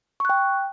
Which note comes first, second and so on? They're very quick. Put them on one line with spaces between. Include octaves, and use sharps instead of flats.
C#6 F#6 G5